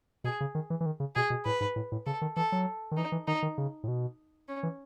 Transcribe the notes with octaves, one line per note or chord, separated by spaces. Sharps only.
B2 G#4
C#3
D#3
E3
E3
D#3
C#3
B2 G#4
B2
A2 B4
G#2
A2
A2
C#3 A4
D#3
E3 A4
F#3
D#3
E3 D#4
E3
D#3 D#4
D#3
C#3
A2
B2
C#4
E3